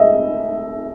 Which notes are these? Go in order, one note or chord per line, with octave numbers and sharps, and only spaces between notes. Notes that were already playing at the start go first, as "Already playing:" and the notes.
Already playing: D#5 E5